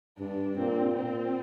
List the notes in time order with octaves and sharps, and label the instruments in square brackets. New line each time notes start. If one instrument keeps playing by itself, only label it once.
[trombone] G2 [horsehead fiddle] D4
[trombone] A#2 [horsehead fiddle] C4
[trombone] A#2 [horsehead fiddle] C4